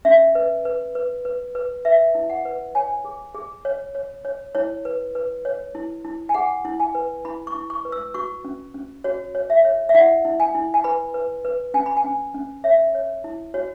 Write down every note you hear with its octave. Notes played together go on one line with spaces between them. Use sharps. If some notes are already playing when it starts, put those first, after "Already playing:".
C#4 E5
B4
B4
B4
B4
B4
B4 E5
E4
F#5
B4
C#5 G#5
G#4
G#4
C#5
C#5
C#5
E4 C#5
B4
B4
C#5
E4
E4
G#5
G#4 F#5
E4
G#5
B4
E4 B5
C#6
E4
C#6
B4
E6
F#4 C#6
C#4
C#4
F#4 C#5
C#5
E5
C#5
E5
E4 F#5
E4
G#5
E4
G#5
B4 B5
B4
B4
C#4 G#5
B5
G#5
C#4
C#4
C#5 E5
C#5
E4
F#4 C#5